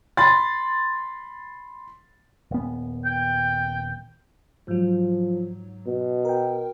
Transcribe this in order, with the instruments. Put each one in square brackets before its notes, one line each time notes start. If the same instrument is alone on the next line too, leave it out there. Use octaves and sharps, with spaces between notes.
[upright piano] B5 C6 A6
[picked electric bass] D#1 B3
[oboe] G5
[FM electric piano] G#2 F#3 [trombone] F3
[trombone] B2
[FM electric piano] A#4 G5